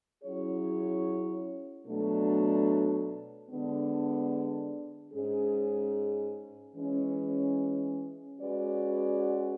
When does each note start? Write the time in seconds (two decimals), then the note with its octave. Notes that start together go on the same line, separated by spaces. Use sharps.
0.22 F#3 C#4 E4 G#4 C#5
1.85 B2 F#3 A3 D4 A4
3.50 D3 G#3 B3 D4
5.13 G#2 G#3 C#4 G#4
6.76 E3 G#3 C#4
8.39 G#3 C#4 F#4 B4 D5